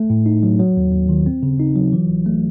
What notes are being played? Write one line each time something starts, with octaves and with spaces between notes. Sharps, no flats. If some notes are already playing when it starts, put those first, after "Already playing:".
Already playing: A3
A2
D#4
F#3
F#3
D#2
D#2
D#3
C4
C#3
D#4
F#3
E3
G#1
A3